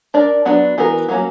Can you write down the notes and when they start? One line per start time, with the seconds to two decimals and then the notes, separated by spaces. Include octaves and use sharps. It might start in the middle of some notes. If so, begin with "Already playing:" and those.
0.14 D4 A#4 D5
0.45 F#3 B3 D4 F#4 B4
0.78 E3 B3 F#4 A#4
1.09 F#3 A#3 C#4 F#4